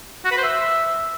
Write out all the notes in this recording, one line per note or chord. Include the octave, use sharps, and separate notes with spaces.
F#4
B4
C5
E5